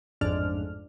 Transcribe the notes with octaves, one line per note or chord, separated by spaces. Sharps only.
A1 F2 G#2 D4 F6